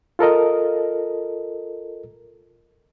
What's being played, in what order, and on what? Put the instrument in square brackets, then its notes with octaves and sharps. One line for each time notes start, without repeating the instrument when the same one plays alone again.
[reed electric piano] F4 A4 A#4 D#5